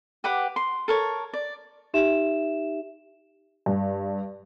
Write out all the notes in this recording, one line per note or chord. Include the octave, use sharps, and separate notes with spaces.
G4 B4 F#5 D6
C6
A4 A#4 C#5
D5
D#4 G4 E5 E7
G2